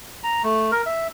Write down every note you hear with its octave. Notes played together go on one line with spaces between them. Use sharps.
A#5
A3
A#4
E5